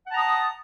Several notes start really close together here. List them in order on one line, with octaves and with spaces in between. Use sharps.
F#5 A5 A#5 D#6